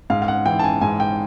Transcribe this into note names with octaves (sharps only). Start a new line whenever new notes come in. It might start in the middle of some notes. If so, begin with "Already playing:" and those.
G#2 F5
F5
F#5
E3 G5
A5
G#5
G#2 G#5
G5